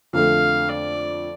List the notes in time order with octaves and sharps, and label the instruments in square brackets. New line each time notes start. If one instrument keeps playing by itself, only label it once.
[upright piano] F2 D3 A3 [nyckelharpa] F5
[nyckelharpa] D5